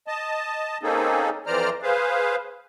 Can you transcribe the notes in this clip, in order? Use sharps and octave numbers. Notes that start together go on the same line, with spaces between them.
D#5 A5
A#3 C4 C#4 D#4 G#4 A4
F2 E3 C5 D5 A#5 F6
G#4 B4 C5 F5